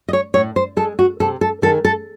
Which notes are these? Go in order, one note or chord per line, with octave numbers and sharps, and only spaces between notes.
D#5
C#5
A2 C#5
C5
G#3 A4
F#4
C3 A4
A4
D#3 G#3 A4
A4